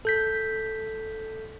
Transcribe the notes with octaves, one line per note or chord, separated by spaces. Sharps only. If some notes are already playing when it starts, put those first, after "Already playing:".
A4 G6 B6